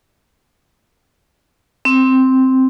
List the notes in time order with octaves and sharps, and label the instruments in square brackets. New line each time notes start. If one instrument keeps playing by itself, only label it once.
[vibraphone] C4